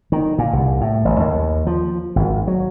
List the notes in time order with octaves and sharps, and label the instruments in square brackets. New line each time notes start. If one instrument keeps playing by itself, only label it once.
[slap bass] D#3
A#2
C2
A2
A1
D#2
F3
G#1
F#3